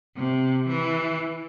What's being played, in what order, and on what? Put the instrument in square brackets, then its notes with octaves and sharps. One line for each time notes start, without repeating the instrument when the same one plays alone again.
[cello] C3
E3